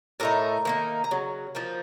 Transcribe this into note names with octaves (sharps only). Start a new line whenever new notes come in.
A2 A3 D#4 A#4 A#5
D#3 A#3 D#4
A#5
C#3 F#3
F3 A#3 D#4